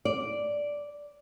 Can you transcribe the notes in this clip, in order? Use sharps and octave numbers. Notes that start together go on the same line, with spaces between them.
D5